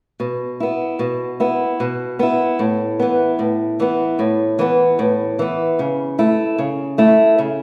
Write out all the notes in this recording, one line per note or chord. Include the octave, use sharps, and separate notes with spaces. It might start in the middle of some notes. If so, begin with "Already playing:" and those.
B2
B3 E4
B2
B3 E4
B2
B3 E4
A2
E3 B3
A2
E3 B3
A2
E3 B3
A2
E3 B3
C#3
A3 E4
C#3
A3 E4
C#3